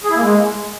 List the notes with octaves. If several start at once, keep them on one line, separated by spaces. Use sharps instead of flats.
G#4
E4
A#3
G#3